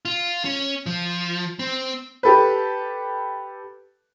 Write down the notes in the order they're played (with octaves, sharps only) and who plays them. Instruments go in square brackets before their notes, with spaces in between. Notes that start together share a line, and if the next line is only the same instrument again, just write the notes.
[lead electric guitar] F4
C#4
F3
C4
[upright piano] G4 A4 B4